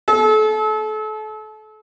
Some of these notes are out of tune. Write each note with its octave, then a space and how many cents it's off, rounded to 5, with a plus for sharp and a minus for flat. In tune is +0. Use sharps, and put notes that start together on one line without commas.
A4 -35